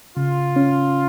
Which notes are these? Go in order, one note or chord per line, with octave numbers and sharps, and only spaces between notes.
C#3 F4
C#4